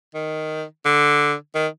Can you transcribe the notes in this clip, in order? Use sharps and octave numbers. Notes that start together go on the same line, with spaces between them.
D#3
D3
D#3